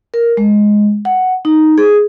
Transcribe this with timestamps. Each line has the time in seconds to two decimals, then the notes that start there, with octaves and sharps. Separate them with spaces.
0.14 A#4
0.37 G#3
1.05 F#5
1.45 D#4
1.78 G#4